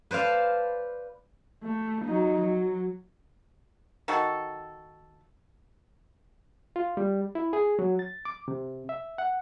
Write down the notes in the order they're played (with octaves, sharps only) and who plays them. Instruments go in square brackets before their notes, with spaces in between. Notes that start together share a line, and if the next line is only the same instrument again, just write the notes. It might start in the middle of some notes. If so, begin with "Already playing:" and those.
[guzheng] B4 C5 D5 F5 A5
[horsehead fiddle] A3
F#3 D#4
F#3
[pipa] D#3 F#4 A4
[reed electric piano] F4
G3
E4
G#4
F#3
A6
D6
C3
E5
F#5